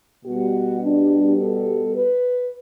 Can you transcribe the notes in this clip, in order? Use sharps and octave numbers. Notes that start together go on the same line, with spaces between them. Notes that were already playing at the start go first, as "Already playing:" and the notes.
B2 G3 F#4
D4
A4
B4